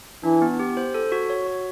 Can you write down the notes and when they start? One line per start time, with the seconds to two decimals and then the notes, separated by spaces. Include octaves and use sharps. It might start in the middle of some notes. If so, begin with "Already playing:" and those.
0.23 E3 D4
0.42 B3
0.59 G4
0.77 C5
0.94 A4
1.12 F#4
1.30 C#5
1.47 F#4